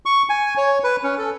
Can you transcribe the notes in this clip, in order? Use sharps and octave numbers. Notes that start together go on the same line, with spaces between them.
C#6
G#5
C#5
B4
C#4
A4